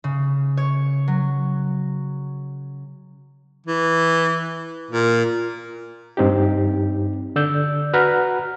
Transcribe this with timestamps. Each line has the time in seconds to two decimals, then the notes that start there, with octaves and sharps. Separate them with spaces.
0.04 C#3
0.57 C#5
1.08 F#3
3.66 E3
4.91 A#2
6.17 G2 C4 D#4 G4
7.36 D3 D5 E6 G6
7.93 F#4 B4 F#5 A#5 F6